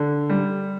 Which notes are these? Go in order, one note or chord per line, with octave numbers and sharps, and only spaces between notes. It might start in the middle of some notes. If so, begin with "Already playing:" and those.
Already playing: D3
G3